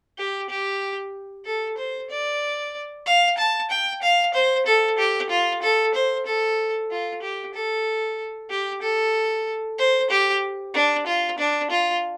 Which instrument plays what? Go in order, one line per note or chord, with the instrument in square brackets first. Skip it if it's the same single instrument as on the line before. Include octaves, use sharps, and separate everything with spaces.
[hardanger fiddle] G4
G4
A4
C5
D5
F5
A5
G5
F5
C5
A4
G4
F4
A4
C5
A4
F4
G4
A4
G4
A4
C5
G4
D4
F4
D4
F4